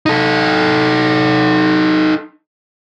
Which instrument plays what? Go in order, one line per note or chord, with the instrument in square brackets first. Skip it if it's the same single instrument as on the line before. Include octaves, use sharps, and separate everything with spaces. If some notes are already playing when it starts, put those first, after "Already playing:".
[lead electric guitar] D#4 A4